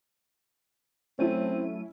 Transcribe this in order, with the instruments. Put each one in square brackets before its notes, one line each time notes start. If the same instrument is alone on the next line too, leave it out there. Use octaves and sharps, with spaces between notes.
[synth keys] F#3 A3 D#7 [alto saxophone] C4 [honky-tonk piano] C#4 E4